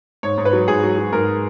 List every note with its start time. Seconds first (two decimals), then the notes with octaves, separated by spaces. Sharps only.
0.23 G#2 C#5
0.37 G#2
0.45 B4
0.53 F#3
0.68 G#2 G#4
0.83 F#3
0.98 F#3
1.12 G#2 A#4